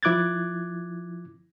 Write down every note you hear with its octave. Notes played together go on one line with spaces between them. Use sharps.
F3 E4 D6 F#6 G#6 A6